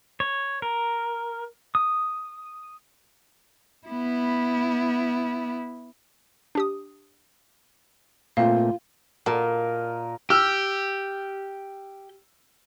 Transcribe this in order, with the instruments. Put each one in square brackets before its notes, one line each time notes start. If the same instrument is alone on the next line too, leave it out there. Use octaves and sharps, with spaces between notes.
[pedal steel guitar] C#5
A#4
D#6
[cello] B3 E4
[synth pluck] D4 G4 D#6
[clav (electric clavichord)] A#2 A3 C4 [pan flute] F4 [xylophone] F5
[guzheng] A#2 [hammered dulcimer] A#4 D#5 A5
[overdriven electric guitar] G4 [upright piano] E6 F6